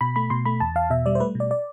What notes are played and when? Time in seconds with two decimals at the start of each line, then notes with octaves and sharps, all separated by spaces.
0.01 B2 B5
0.16 A3 B5
0.30 B2 C6
0.45 A3 B5
0.60 E2 A5
0.76 E2 F5
0.90 B2 E5
1.06 G3 D5
1.15 C5
1.20 A3 B4
1.35 B2
1.40 D5
1.51 D5